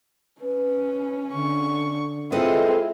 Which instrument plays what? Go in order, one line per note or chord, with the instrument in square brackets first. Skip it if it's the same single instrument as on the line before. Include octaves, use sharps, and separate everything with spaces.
[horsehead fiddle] C#4 [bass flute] B4
[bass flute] D3 [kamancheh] C#6
[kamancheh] G#3 C4 [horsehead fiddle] E4 F4 [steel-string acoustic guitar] A4 B4 D#5